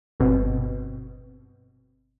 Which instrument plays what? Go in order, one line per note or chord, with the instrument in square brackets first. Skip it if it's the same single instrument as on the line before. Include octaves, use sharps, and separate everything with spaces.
[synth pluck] G1 B2 C4